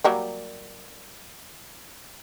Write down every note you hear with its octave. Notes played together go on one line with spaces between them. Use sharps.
F#3 G3 A#3